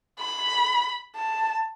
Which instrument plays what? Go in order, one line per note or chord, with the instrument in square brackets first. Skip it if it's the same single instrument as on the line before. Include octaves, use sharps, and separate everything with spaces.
[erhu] B5
A5